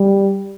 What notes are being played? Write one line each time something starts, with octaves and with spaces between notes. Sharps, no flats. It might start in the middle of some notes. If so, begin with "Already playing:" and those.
Already playing: G3